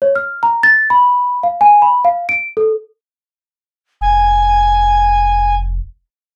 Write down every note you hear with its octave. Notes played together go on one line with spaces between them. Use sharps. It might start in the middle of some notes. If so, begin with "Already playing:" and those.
C#5
F6
A#5
A6
B5
F5
G#5
B5
F5
D7
A4
F1 G#5